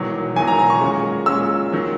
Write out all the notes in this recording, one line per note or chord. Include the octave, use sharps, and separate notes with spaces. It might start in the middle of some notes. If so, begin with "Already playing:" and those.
Already playing: E1 E2 D#3 F#3
E1 E2 D#3 F#3 G#5
A#5
A#5
C#6
A#2 G#3 C#4
A#2 G#3 C#4 E6
D#3 F#3